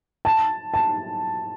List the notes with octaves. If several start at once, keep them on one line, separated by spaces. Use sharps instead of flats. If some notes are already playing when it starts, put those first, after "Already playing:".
A5
A5